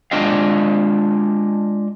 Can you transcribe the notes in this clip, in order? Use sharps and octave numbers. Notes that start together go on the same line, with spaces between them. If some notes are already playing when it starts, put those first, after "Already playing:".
G#3 B3 D4 F4 D#5 F5